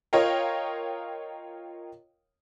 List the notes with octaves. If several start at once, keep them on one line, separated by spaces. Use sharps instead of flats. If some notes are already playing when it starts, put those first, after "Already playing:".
F4 A#4 C#5 D#5 F5 G5